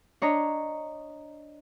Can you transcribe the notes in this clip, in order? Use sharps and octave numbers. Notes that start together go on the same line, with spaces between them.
D4 C#5 D#5 A#5